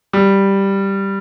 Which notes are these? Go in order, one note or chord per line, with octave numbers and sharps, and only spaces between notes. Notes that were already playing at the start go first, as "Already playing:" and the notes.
G3